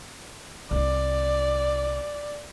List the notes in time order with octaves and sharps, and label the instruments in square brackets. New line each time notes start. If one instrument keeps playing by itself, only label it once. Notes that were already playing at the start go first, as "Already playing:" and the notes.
[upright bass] C2 E4 [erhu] D5